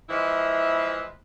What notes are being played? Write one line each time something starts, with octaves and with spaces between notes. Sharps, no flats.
E3 F3 G#3 E4